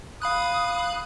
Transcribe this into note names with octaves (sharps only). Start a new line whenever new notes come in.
F5 B5 D#6 F#6